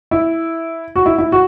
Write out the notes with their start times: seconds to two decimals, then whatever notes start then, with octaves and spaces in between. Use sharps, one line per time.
0.11 E4
0.96 F#4
1.06 E4
1.18 E4
1.32 F#4